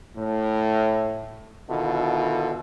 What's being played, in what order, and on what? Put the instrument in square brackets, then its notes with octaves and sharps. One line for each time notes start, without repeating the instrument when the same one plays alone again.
[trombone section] A2
B2 D3 D#3 E4 F4 A4